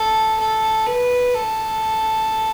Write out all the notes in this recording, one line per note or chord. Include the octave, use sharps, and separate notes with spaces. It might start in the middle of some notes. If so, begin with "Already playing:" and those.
Already playing: A4
A4
B4
A4